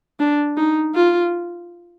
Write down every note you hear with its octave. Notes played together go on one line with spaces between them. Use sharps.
D4
D#4
F4